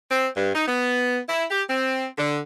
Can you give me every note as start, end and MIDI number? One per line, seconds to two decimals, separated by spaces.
0.11 0.27 60
0.36 0.51 43
0.55 0.65 63
0.68 1.19 59
1.29 1.46 64
1.51 1.63 67
1.70 2.06 60
2.18 2.40 50